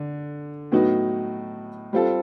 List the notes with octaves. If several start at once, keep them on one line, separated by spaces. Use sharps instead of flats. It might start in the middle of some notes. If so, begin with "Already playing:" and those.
Already playing: D3
A2 F#3 B3 D#4 F#4
G3 C4 F4 A4